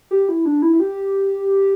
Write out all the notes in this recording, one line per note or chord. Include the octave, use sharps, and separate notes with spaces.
G4
E4
D4
E4
E4
G4